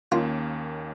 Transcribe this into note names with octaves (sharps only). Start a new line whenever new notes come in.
D#2 D#3 A#3 C#4 F4